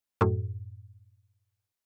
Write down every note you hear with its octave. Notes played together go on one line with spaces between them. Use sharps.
F#2 A2